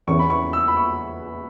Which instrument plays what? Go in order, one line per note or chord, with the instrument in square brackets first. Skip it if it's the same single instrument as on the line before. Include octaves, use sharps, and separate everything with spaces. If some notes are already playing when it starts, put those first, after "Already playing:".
[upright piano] E2 E3 C#4 E4 B4 [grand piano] C#6
[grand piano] B5
C#6
E6
B5
C#6